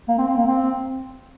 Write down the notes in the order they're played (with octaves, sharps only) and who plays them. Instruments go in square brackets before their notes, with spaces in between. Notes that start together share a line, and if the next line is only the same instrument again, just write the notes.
[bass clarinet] A#3
C4
C4
A#3
C4